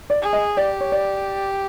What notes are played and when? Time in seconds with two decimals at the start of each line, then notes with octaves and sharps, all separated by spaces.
0.10 D5
0.22 G#4
0.33 D#5
0.57 G4 D5
0.80 C#5
0.92 D5